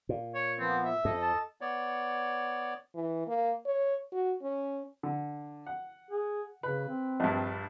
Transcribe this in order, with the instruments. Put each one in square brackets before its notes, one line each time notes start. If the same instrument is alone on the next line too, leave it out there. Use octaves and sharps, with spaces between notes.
[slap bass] A#2
[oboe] C#5
[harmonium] F3 B3 [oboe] C4
[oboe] E5
[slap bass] F2 [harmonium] A4 D#5
[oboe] A5
[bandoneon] B3 C#5 D5
[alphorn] E3
A#3
C#5
F#4
C#4
[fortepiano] D3
F#5
[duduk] G#4
[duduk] C#3 [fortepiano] B4
[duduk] C4
[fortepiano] A#1 G2